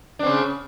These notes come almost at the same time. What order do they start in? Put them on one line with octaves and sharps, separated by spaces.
D4 C4 C#3